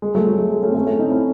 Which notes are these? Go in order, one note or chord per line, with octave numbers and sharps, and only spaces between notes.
G#3
F#3 A3
F#3
G#3
G#3
A3 C#4
C4
A3 C#4
A3 C#4
C4 D#4
C#4 E4